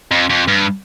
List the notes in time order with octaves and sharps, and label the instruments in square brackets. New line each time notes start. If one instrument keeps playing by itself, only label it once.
[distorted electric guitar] F2
F2
G2